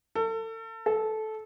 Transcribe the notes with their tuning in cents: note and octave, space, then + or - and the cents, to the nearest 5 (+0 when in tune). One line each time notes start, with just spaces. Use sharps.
A4 +35
A4 -15